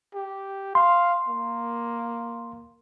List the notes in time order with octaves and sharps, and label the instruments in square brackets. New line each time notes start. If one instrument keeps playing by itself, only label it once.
[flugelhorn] G4
[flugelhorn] F5 [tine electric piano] C6
[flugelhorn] A#3